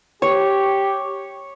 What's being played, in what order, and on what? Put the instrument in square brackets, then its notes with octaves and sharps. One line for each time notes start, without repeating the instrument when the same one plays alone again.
[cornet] G4 [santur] C#5